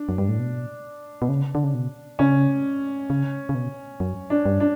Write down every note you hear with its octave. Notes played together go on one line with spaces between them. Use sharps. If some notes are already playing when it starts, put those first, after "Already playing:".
Already playing: D4
F#2
G2
A2
B2
B2
C#3
D3
C#3
B2
C#3 C#4
C#3
C#3
B2
F#2
D4
G2
D4